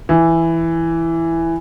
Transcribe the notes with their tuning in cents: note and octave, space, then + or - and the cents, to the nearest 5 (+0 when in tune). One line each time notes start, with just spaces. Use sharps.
E3 +5